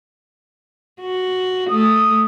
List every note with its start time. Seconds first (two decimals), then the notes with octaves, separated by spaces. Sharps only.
1.00 F#4
1.70 A3 D#6